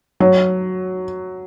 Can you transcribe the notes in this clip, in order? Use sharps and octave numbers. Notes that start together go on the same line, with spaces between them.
F#3